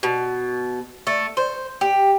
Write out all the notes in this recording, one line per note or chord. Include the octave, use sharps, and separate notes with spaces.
B2
A3
C5
G4